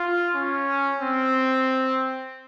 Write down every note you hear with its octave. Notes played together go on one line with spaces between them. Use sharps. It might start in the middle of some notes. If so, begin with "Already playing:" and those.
Already playing: F4
C#4
C4